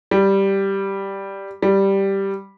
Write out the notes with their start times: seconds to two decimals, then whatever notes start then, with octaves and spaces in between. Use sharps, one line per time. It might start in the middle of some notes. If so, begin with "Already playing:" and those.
0.11 G3
1.62 G3